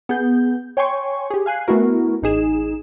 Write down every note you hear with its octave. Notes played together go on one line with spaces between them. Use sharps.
B3 G#4 G6
C#5 G5 G#5 C6 C#6
G4 G#4
F5 G#5 F#6 C7
A3 B3 E4 F#4 A#4
A1 D#4 G#4 E7